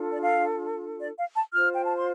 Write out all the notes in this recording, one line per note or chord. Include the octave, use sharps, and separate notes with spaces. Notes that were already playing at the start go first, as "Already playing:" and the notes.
Already playing: D4 F4 A4
D5
F5
D5
F5
A5
F4 C5 F6
G5
A5
C6